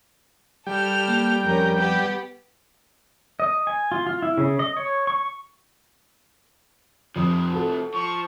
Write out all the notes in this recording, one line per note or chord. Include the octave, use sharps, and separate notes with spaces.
G3 A4 G5 F6
A#3
F2 C#4 A#4
B3 G4
D#5
G#5
F4
F4
E4
C#3
D#5
C#5
C#6
F2 C3 F3 D#6
F#4 A4
F3 C#6